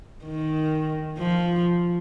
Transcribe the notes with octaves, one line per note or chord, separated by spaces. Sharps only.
D#3
F3